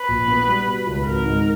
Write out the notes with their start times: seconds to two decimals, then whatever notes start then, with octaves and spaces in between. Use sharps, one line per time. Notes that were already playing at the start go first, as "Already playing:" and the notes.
Already playing: B4
0.08 A#1
0.28 B3
0.48 G3
0.67 B2
0.87 C#2
1.06 G#1 A#4
1.26 G#2